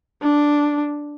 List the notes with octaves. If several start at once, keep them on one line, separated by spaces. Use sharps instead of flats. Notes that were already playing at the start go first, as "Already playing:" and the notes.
D4